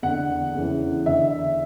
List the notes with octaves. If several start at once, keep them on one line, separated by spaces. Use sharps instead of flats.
E2 D3 F#5
E2 C#3 E3
E2 D3 E5